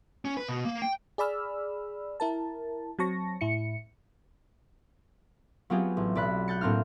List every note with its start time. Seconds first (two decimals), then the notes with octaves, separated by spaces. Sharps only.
0.25 C#4
0.37 B4
0.49 B2
0.65 A#3
0.82 G5
1.18 G#4 D5 B5 E6 F6
2.20 E4 A#4 A5
2.99 F#3 C4 A5 C#6 A#6
3.41 A2 E4 C#7
5.70 F#3 B3 C4 F4 G4 G#4
5.97 A1
6.15 B1 D5 B5 F#6
6.48 F#6 G6 A6 C#7
6.61 A2 A#3 C4 D4 F6